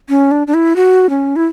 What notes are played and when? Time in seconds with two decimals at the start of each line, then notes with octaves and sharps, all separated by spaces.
0.09 C#4
0.31 D4
0.47 D4
0.54 E4
0.76 F#4
1.10 C#4
1.36 E4